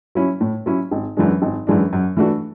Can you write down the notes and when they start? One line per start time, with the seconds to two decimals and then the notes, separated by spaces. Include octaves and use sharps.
0.15 F#3 C#4 E4
0.40 A2
0.66 F#3 C#4 E4
0.92 G#1
1.17 F#2 E3 G#3 D4
1.42 G#1
1.67 F#2 E3 G#3 D4
1.93 F#2
2.17 E3 A3 D4 F#4